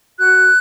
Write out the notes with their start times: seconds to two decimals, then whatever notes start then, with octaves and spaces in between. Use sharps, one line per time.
0.18 F#4 F#6